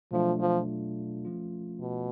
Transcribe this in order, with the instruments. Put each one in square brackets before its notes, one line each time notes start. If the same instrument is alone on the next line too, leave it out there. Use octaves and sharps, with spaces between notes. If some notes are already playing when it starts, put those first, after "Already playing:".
[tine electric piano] B2 F#3 A3 D4 F4 [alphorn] F3
[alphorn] F3
[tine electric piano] F3 A3 C#4 F4
[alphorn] B2